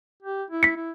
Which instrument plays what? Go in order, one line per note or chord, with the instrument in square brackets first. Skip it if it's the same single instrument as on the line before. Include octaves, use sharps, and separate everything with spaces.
[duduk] G4
E4
[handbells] B6 C#7
[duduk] E4